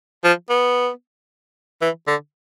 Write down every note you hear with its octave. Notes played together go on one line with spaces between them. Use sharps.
F3
B3
E3
D3